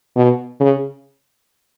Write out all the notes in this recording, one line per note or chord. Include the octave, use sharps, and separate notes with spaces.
B2
C#3